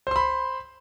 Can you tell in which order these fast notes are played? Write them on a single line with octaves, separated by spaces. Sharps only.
C5 C6 B5